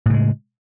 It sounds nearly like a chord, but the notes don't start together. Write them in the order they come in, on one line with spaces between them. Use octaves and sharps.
A2 C#3 G#3